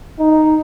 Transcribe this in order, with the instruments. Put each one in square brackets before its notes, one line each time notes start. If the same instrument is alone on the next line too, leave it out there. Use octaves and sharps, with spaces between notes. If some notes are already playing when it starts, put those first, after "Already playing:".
[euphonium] D#4